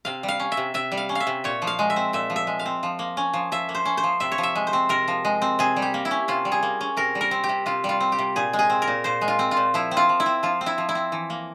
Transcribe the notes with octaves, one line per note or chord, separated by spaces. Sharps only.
C3 F5
G3
F5
C#4
E5
C3
C3 E5
G3
F5
C#4
E5 F5
C3
A#2 C#5
F3
F5
G#3
E5
C4
A#2 E5
F3
E5
G#3
F5
C4
F3
A#3
C#4
F3
F3 E5
A#3
C5
C#4
C5
F3
C3 E5
C#5
F3
E5
G#3
C5
C4
C3 A#4
F3
G#3
C4
C3 G#4
G3
G4
A#3
E4
C#4
C3 F4
G3
G#4
A#3
C#4
C3 A#4
G3
A#4
C4
G4
C3
C3 F4
G3
F4
C4
G4
C3
A#2 G#4
G#3
G#4
C4
A#4
A#2
A#2 C5
G#3
F4
C4
F4
A#2
F3 E4
C4
F4
F3
E4
C4
F3 F4
C4
E4
F3
E4
C4
E3
A#3